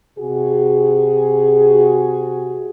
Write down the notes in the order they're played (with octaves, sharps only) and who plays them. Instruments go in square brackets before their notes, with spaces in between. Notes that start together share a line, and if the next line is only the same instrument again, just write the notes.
[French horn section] C3 F#4 G#4